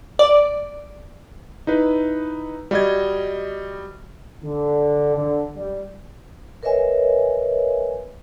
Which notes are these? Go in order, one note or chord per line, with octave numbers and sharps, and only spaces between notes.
D5
D#4 E4 B4
G3 F#4 D#5 G#6
D3
D3
G3
A#4 B4 C#5 D#5 E5 G#5